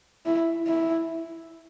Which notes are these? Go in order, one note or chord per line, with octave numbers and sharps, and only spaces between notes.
E4
E4